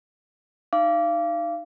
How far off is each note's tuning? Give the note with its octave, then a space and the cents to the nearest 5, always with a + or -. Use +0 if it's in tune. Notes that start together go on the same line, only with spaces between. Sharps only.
D#4 -15 F5 -30 D6 -15